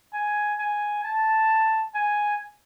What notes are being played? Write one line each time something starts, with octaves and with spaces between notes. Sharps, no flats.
G#5
G#5
A5
G#5